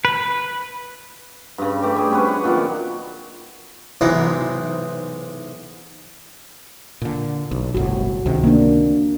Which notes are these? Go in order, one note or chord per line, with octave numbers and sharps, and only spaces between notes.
B4
G2 C#3
A3 G4 D6
G3 G#4
C4 C#4 F#4 B4
B4 F#5
A#2 D#3 F#3 D5
B1 G#2 C3 E3 A#5
A#2 D3
B1
G1 C2 A2 F#4
C#2 C3 D#3
A#3 D4